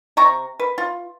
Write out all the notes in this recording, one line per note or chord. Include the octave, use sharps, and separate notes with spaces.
C3 A#5 C#6
B4
F4